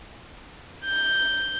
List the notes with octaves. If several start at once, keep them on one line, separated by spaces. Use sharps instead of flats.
G6